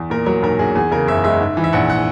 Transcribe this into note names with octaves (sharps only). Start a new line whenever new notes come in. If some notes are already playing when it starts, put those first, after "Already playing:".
Already playing: E2
A#2 A#4
F#3 A#4
B1 A#4
B1 G#4
E2 G#4
C#3 A#4
F#1 E5
G#3 E5
G#2
E3
E5
A#1 F#5
F#5